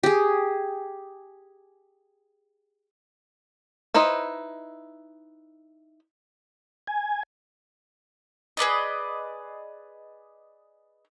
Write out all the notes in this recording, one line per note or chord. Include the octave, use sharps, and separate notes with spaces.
G4 G#4
D#4 E4 B4 C5 D#5
G#5
G#4 B4 D5 D#5